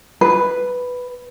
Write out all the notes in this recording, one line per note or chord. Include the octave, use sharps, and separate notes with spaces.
B4